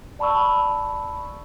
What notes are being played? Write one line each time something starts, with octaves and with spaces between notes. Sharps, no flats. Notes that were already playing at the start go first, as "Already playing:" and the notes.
D5 A5 B5 C#6 E6